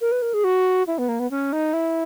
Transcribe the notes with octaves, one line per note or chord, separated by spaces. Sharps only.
A#4
B4
A#4
G#4
F#4
E4
B3
A#3
B3
C#4
D#4
E4